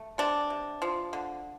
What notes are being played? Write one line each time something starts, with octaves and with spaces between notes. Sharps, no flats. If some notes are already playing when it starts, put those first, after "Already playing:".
Already playing: A3
C3 D4
C3
F3
D3